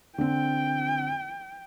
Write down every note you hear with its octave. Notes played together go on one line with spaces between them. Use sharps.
D3 C4 G5